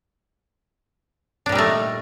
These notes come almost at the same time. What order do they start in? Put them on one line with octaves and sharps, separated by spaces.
D4 A#2 G3 D#4 A3